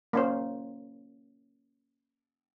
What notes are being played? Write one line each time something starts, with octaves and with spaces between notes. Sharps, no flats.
A#3 C#4 C5